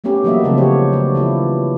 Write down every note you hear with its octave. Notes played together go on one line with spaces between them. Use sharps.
G3 A3 B3 C#4 G4
E3 F#3 A#3 D4 D#5 E5
C#3 F3 F#3 A3 C4
G4 C5 C#5
A3 D4
E3 E4 F4